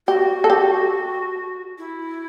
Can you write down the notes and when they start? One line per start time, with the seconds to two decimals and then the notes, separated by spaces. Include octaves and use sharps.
0.08 F#4 G4
0.44 A4
0.50 G4
1.79 E4